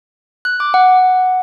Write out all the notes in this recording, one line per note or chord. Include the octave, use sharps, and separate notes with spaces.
F#6
D6
F#5